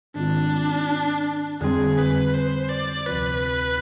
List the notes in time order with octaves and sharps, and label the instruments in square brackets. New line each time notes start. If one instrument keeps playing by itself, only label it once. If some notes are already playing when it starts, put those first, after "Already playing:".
[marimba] G#2 D#3 G#3 C4 F4 [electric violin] D4
[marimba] F2 D3 G3 C4 [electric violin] G#4
[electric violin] B4
C5
D5
[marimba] D2 C3 F3 C4 F4 [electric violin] B4